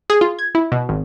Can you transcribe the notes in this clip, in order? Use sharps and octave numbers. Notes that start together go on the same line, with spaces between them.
G#4
F4
G#6
E4
B2
G#1